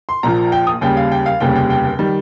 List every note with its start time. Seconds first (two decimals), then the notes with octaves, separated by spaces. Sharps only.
0.09 C6
0.23 A#1 A#2 F3 A#5
0.52 G5
0.67 D#6
0.81 D#2 C#3 G3 G5
0.97 F5
1.12 G5
1.26 F5
1.40 F1 D#2 C#3 G3 G5
1.56 G5
1.70 G5
1.99 D#3 G3